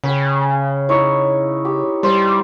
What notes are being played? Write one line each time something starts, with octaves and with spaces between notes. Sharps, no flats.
C#3 G5 B5
D#4 E4 C#5
G4
G3 C5